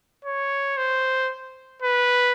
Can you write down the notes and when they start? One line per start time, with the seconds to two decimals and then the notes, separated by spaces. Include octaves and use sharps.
0.25 C#5
0.77 C5
1.83 B4